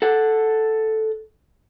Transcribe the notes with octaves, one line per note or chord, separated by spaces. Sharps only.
A4 F#5